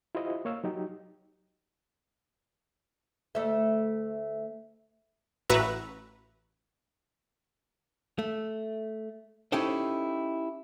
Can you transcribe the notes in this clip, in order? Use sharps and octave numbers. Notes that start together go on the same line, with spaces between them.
E4 F4 G4 C5 D#5
A#3 C#5 F5 E6
F#3 D#4 G4
D2 A3 E5
A1 F#4 B4 E5 A#5
A3
C#4 D#4 E4 G4 A4 C5